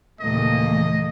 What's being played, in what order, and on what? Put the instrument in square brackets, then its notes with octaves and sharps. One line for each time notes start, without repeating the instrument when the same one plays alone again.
[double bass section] D#2 A#2 C#3 [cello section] E3 A3 A#3 [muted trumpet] D#5